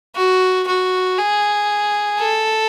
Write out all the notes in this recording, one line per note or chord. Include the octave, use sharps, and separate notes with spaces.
F#4
F#4
G#4
A4